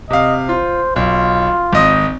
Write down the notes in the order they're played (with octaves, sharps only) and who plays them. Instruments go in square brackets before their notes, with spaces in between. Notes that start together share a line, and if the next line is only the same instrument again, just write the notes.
[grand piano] C3 F5 [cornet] D#5
[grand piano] F4 [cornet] C5
[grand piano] B1 [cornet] F4
[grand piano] G#1 D#5 D#6